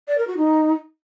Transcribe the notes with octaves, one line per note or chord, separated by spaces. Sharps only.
D5
A#4
F#4
D#4